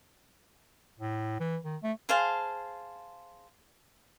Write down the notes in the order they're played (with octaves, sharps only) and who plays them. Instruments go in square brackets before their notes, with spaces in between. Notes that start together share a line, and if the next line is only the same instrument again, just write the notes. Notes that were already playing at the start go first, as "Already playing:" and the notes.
[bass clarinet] A2
E3
D#3
A3
[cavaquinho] G#4 C5 F5 A5